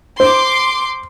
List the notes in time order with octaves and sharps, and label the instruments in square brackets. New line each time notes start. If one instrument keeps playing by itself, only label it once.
[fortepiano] C5 [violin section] C6 D6